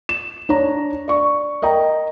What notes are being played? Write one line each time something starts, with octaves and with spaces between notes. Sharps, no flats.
E7
D4 C#5 A#5
D5 C#6
A#4 D#5 G5 A#5